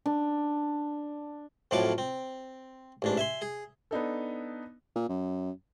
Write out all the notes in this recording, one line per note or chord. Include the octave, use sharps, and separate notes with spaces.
D4
F2 A2 F3 F#3 C#5 D6
C4
A1 G#2 D4
E5 G#5 C6
G#4
B3 D4 D#4 A4
A#2
F#2